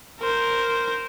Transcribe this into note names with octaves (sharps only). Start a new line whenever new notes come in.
A#4 C5